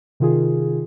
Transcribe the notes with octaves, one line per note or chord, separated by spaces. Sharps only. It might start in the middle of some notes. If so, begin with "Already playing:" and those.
C3 D#3 F4 G#4